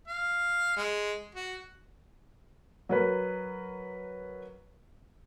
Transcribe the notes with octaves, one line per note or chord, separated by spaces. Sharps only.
F5
G#3
F#4
F#3 A#4 B4